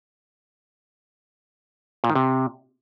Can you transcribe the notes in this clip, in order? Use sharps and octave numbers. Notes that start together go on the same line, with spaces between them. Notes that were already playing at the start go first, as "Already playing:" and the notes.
A#2
D#3
C3